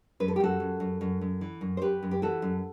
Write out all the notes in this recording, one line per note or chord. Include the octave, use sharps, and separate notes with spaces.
F#2 B4
A4
G4
F#2 F#4 A4
F#2
F#2
F#2
F#2
E3
F#2
C5
F#2 G4 B4
F#2
G4
E3 F#4 A4
F#2